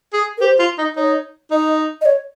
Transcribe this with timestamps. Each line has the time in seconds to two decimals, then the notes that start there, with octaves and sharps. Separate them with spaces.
0.13 G#4
0.38 A#4
0.41 G4 C5
0.59 F4
0.78 D#4
0.96 D#4 C#5
1.51 D#4 D#5
2.01 D#5
2.06 C#5